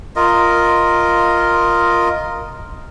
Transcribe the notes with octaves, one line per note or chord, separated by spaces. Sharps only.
F4 A#4 D#5